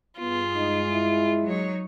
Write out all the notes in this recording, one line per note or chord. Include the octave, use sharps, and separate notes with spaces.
G2 B3 F4 G#4
G#3 D#4
E4
F#3 D#4 C#5